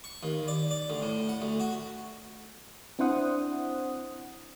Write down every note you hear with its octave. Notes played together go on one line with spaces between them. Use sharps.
C#6
D#2
D5
D5
D2
A2
F#5
D2
F#4
C4 D4 E4 C5 F#5 D#6